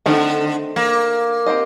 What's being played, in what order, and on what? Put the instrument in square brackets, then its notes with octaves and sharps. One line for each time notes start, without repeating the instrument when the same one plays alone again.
[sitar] D3 [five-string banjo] D#3 A3 C4 D#4 A4
[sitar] A#3
[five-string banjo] C4 G4 C5 D#5